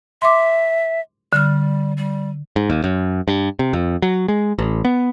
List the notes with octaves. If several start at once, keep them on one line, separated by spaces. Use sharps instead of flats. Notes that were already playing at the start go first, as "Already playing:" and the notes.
E5 C6 D6
D3 G3 F6
G3
G#2
D#2
F#2
G2
C3
F2
F#3
G#3
A1
B3